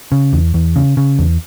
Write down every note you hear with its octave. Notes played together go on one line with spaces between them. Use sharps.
C#3
E2
E2
C#3
C#3
E2